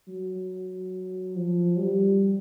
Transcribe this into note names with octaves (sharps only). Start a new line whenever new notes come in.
F#3
F3
G3